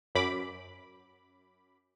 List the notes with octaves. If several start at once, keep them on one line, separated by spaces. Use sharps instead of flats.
F#2 B5 D6